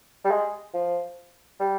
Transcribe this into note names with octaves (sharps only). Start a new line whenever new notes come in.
G3
G#3
F3
G3